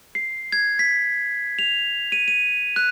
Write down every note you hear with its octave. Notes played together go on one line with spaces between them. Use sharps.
C7
G#6
B6
F7
D#7
D#7
F#6